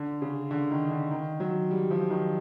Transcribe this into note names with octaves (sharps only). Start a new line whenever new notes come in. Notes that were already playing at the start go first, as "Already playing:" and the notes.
Already playing: D3
C#3
D3
D#3
D3
D#3
F#3
G3
F3
D#3